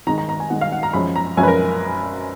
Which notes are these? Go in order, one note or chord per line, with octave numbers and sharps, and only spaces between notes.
D#3 G#3 D#4 A#5
A#5
A#5
G#5
D#3 G#3 D#4 F#5
F5
F#5
A#5
F#2 F3 G#3 C#4 B5
A#5
F#2 F3 G#3 C#4 G#5
B4
A#4